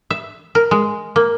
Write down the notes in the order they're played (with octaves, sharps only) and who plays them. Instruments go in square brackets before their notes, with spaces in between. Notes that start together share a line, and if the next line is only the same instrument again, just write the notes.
[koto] E5
A#4
G#3
A#3